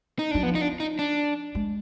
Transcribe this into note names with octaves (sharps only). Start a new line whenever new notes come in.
D#4
F#3 D4
F3 B3
D#4
D4
D#4
D4
G#3